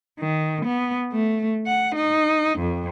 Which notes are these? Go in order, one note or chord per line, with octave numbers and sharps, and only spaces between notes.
D#3
B3
A3
F#5
D#4
F2